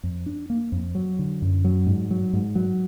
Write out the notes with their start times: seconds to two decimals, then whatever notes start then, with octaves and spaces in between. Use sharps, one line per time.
0.03 F2
0.26 D4
0.50 A#3
0.72 F2
0.95 F#3
1.19 D3
1.42 F#2
1.65 F#3
1.87 G#2
2.11 F#3
2.33 G#2
2.55 F#3